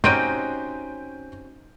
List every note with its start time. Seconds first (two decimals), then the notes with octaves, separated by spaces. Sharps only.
0.04 C4 C#4 D#4 F#4 G4 G6 D7 D#7